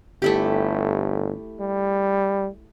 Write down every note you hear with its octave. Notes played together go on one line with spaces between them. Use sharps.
G1 A3 E4 G4
G3